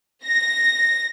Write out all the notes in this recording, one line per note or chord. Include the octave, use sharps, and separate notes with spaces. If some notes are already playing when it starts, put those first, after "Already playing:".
A#6